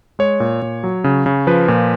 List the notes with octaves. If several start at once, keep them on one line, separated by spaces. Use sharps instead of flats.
G#3 C#5
A#2
A#2
F#3
C#3
C#3
F3 B4
A#2